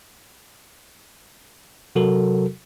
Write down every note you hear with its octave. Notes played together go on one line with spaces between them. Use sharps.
C3 F#3 F#4 A4 A#4